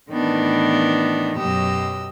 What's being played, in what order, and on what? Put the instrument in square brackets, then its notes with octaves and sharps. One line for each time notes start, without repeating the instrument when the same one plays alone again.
[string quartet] A2 D#3 E3 B3 D4
F#2 B2 F#3 G4 D#5 E6